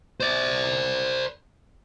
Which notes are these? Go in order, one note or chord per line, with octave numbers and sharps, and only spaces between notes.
C5 D5